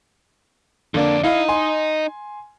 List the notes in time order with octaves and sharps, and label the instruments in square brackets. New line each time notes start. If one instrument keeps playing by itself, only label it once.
[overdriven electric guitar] F2 D5 [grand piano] D3 A#3 D4
[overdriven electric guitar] D#4 D#5 [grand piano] E4 F5
[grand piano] G#5 C6